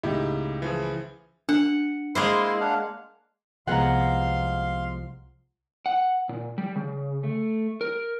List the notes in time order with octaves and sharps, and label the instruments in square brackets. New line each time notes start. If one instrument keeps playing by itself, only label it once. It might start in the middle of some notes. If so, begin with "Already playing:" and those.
[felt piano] C#2 A2 [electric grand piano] D#4 E4 G4
[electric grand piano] E3 F3 G#4
[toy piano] D4 [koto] F#5
[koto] G#3 A#3 C5 [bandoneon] E4 C6
[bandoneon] D4 F5 F#5
[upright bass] C2 [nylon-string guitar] F3 G#3 B3 [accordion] F5 C6 [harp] F#5 A#5
[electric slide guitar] F#5
A#2
G3
C#3
A3
A#4